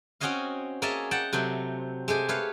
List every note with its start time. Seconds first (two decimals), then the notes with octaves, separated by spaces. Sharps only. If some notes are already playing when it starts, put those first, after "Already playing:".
0.20 C4 C#4 F#4 C#5 D#5 F5
0.82 A#3 G#4 C#5 D#5 E5 A5
1.11 F#5 G5 A5
1.33 C3 F#3 A3 C4
2.08 G#3 A3 G4 G#5
2.29 A3 B4 C#5 F5